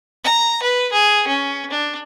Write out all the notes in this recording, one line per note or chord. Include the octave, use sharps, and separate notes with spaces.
A#5
B4
G#4
C#4
D4